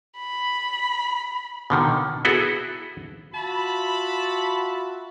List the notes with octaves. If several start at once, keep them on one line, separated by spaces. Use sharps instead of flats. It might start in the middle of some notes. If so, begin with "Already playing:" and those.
B5
B2 D3 D#3
B3 E4 F#4 G#4 A4
F4 F#4 E5 A5 B5